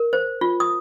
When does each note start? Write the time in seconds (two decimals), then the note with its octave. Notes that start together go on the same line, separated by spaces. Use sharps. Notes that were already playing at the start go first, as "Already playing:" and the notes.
Already playing: A#4
0.13 C5
0.41 F4
0.60 D#6